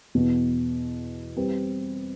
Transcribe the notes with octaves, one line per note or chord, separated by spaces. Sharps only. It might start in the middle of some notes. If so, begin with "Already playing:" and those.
E2 B2 B3
G3 C4 G4 B4